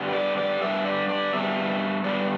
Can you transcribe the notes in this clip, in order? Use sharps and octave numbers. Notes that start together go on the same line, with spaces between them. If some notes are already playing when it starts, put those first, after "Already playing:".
Already playing: G2 G3 B3
B4
D5
D5
G2 G3 B3 E5
D5
D5
G2 G3 B3 E5
G2 G3 B3 D5